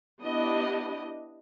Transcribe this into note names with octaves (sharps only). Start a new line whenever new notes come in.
B3 D4 E4 G4 D#5